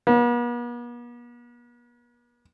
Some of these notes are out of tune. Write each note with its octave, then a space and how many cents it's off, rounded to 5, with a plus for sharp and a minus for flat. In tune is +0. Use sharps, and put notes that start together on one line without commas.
B3 -45